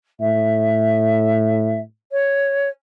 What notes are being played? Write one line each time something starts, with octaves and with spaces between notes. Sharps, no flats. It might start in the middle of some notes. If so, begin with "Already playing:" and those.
A2 E5
C#5